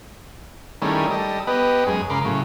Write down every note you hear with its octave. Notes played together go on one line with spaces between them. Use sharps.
D#3 G3 A3 C#4 E4 G#4
G3 A4 D#5
B3 G4 B4 D#5
F#2 G#3 G#4
C#3 A#4 B5 C6 D6
A2 C#3 F#3